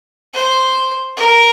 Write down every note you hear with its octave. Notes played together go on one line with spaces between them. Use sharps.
C5
A#4